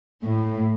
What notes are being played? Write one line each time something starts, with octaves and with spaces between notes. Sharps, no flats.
A2